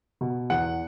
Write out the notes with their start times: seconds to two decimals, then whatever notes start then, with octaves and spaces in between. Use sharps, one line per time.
0.21 B2
0.50 E2 F#5